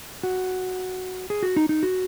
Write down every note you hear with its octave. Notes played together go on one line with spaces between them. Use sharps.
F#4
G#4
F#4
D#4
D#4
F#4